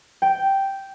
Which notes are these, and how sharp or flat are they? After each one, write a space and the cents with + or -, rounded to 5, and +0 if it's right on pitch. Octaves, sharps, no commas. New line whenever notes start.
G5 -5